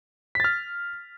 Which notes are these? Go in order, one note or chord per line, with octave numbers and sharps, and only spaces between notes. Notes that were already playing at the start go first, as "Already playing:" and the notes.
F6 A6 B6